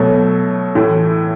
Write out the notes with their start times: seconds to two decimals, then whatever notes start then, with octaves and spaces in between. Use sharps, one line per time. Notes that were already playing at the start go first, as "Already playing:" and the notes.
Already playing: B2 F#3 A3
0.75 A2 E3 A3